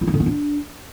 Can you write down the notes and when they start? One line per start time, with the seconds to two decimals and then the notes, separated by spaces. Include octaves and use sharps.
0.01 E4
0.08 D#4
0.14 D3
0.20 B3
0.26 D4